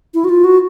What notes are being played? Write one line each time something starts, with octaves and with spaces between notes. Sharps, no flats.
E4
F#4
F4
F#4